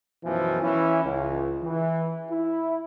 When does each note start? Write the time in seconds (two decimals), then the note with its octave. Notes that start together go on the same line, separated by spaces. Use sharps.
0.25 F#2 B2 E3 F3
0.62 E3 C#4 E4
1.05 C#2
1.63 E3
2.31 E4